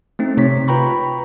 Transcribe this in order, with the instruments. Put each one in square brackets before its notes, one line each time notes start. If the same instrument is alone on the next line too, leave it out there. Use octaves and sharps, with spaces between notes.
[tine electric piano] A3 C4 D#4
C3 C#5 B6
F4 B4 G5 A#5 B5 C#6